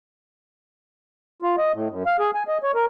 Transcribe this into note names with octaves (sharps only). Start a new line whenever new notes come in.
F4
D#5
A2
F#2
F5
G#4
G#5
D#5
C#5
A#4